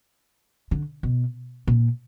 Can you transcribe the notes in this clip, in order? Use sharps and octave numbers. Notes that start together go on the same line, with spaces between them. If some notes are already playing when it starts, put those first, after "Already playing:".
D3
B2
A#2